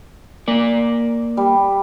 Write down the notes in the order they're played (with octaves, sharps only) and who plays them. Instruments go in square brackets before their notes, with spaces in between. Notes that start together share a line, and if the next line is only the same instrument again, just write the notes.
[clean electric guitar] A#3 D5
[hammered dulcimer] G3